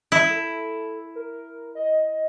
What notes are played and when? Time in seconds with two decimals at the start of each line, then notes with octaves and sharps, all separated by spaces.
0.12 E4
0.30 A4
1.15 A#4
1.75 D#5